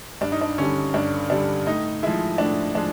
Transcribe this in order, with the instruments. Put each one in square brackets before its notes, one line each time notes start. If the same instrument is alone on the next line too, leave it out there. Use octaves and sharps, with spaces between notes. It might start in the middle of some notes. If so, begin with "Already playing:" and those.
[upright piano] G2 D4
D#4
D4
D3 G3 C#4
G2 D4
D3 G3 D4
A2 D#4
F3 G#3 E4
A2 D4
F3 G#3 D4